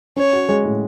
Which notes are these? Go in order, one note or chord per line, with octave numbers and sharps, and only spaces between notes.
C#4 C#5
F#4
G#3
A2